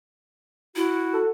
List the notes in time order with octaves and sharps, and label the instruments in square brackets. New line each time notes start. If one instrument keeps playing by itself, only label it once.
[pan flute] E4 [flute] F#4
[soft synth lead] A4